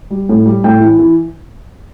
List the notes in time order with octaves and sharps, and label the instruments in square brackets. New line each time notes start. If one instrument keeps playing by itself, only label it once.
[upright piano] G3
A2
G3
A2 G5
E3
E3